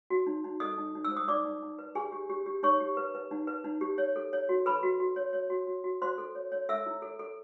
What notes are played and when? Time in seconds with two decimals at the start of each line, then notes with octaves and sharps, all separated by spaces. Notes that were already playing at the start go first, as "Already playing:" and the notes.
0.10 F#4
0.27 D#4
0.44 D#4
0.60 A4 D#5 D#6
0.78 D#4
0.95 D#4
1.04 E6
1.11 C5
1.17 D#6
1.28 D#4 D5 D6
1.45 D#4
1.62 D#4
1.79 B4
1.95 G4 G#4 G#5
2.12 G4
2.30 G4
2.46 G4
2.63 D#4 C#5 C#6
2.80 G4
2.97 B4
3.15 B4
3.31 D#4
3.47 B4
3.64 D#4
3.81 G4
3.98 C#5
4.16 A4
4.33 C#5
4.49 F#4
4.66 A4 B4 B5
4.83 F#4
5.00 F#4
5.16 C#5
5.33 C#5
5.50 F#4
5.67 F#4
5.84 F#4
6.02 F#4 C5 C6
6.18 A4
6.35 C#5
6.52 C#5
6.69 A4 E5 E6
6.86 E4
7.02 A4
7.19 A4